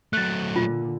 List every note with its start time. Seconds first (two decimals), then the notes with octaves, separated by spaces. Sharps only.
0.13 F#3 A3 F#6 A6
0.56 A#2 D3 F4